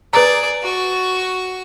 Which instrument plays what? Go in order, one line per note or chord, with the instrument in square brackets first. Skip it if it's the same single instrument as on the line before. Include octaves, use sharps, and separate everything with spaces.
[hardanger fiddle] G#4 D5 [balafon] B4 A#5
[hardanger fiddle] F#4 C#6